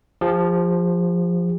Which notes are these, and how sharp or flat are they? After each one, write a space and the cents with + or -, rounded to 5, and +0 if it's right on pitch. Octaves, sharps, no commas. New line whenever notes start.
F3 +0 G4 +45